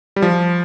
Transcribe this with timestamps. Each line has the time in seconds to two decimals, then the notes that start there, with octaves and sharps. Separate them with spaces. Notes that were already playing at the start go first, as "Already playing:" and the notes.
0.16 G3
0.22 F3